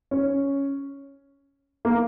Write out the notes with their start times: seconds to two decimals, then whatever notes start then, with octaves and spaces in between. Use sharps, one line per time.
0.11 C#4
1.85 A#3